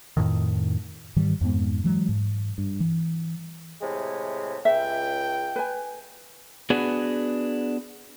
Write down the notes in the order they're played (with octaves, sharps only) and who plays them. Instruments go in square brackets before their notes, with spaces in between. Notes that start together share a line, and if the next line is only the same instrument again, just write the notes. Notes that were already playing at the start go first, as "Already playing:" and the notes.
[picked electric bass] F2 A2 D#3
[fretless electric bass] G#2 D#3 E3 G3
F2 G#2 G#3 B3
E3 F#3 G#3
G#2
G2
E3
[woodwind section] A2 C3 G#3
[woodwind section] C#2 [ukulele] E5 [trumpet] G5
[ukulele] B4 G#5
[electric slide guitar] B3 D4 F#4 G#4 B4